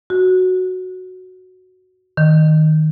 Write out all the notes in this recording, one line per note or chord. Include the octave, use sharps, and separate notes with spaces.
F#4
D#3